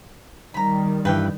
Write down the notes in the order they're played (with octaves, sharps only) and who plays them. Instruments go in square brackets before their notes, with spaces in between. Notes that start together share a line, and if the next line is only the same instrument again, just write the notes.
[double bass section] D#3 G3 [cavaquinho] A#5 B5
[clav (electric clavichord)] G2 E3 [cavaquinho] B4 G5